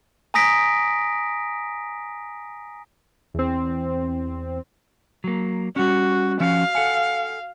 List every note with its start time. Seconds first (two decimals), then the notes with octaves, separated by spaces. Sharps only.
0.34 G#5 A#5 D#6 A#6 B6 D7
3.34 E2 C4
5.24 F#3 A#3
5.76 G3 C#4 F#4
6.40 F3 C#4 F#4 F5
6.75 A4 F#5 G#5